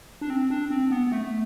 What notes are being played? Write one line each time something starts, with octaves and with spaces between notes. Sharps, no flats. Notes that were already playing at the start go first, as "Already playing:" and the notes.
D4
C4
D4
C4
B3
B3
A3